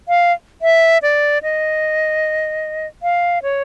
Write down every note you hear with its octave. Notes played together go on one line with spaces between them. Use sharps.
F5
E5
D5
D#5
F5
C#5